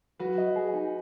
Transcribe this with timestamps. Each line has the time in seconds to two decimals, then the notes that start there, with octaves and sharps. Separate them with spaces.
0.19 F#3 F#4 B4
0.38 D#5
0.56 G#4
0.74 D#4